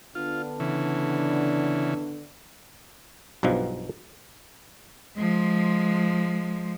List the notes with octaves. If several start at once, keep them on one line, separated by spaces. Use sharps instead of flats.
D3 B3 D4 F4
C#3 E3
B1 G2 B2 F3
F3 G#3